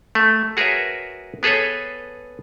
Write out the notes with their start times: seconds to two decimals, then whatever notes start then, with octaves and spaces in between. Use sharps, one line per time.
0.15 A3
0.57 F#4 G#4 A#4 B4 C#5 E5
1.43 B3 G#4 A4 B4 C#5